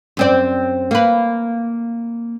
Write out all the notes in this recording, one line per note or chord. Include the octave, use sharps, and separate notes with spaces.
F#2 C4 D5
A#3 B4